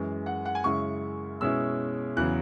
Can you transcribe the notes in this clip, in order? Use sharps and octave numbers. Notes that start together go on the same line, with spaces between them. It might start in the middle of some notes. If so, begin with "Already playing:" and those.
Already playing: F#2 E3 G#3
F#5
F#5
G#5
F#2 C#3 G#3 E4 C#6
B2 G#3 C#4 E4 E6
E2 C#3 F#3 B3 F#6